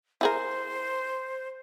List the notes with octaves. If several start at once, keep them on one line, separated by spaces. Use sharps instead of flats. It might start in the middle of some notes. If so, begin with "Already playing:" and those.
E4 G#4 A#4 C5